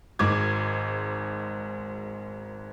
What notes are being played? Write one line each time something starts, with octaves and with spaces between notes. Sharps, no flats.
G#1 G#2 D6 G#6